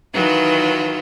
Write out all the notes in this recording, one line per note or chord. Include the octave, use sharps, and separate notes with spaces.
D#3 E3 F#3 F4 F#4